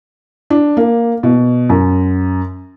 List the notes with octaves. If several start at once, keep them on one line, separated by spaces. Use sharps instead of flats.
D4
A#3
B2
F#2